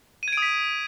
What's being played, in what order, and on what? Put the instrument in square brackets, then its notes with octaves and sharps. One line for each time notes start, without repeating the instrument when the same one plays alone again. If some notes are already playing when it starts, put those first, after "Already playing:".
[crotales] D#7
G#6
D7
D#6
B6